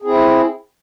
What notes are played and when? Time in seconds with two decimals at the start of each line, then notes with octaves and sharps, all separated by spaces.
0.02 G#4
0.05 C4
0.08 E4